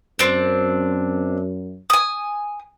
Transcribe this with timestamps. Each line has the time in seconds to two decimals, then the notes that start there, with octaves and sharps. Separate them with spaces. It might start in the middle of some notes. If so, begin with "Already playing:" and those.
0.19 F#2 C4 D4
1.90 G#5 D#6